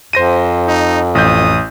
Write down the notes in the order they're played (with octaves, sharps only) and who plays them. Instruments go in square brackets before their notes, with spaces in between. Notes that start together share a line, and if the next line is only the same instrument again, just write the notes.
[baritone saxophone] F2 [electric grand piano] C5 A#6 D#7
[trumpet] D#4
[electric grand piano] A1 G6 [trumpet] D#6